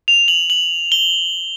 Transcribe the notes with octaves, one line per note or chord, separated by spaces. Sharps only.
F7
F#7
F#7
G7